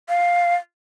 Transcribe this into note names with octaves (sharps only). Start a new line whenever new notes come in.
F5